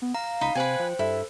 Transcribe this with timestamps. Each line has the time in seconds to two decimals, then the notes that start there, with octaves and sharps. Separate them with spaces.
0.02 B3
0.15 F5 A#5
0.41 C#2 D#4 B5
0.55 C3 B4 C5 G5 G#5
0.80 F3
0.99 G2 E4 A4